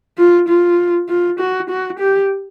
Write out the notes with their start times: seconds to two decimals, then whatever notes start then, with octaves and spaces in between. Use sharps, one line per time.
0.18 F4
0.48 F4
1.09 F4
1.39 F#4
1.70 F#4
1.99 G4